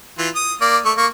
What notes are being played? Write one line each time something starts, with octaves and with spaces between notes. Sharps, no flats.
E3 F4
D#6
A#3 D5
A3 C#6
A#3 C#6